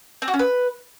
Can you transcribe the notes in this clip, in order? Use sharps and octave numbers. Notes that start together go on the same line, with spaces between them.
C4
F#4
C#4
B4